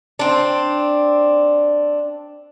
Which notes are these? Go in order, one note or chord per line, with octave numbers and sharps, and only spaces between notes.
C4 D4